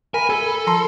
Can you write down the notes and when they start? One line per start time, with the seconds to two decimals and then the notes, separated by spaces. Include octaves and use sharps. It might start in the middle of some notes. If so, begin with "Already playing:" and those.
0.14 A#4 G#5 B5
0.30 A4 G#5
0.67 F3 A5 A#5 C6